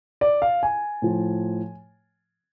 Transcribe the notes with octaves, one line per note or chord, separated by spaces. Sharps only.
D5
F5
G#5
A2 F3